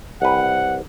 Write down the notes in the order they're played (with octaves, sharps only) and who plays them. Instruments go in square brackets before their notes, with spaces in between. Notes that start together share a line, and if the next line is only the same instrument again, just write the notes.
[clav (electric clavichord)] C2 B4 [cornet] F#5